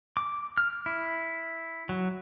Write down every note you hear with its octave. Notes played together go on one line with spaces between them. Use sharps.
D6
F6
E4
F#3